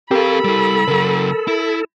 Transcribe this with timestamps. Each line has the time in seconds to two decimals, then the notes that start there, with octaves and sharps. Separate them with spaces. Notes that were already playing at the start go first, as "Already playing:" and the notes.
0.11 C4 G4 A4 A#4 F5 B5
0.44 G3 E4
0.88 C#3 F#3 A#4
1.47 E4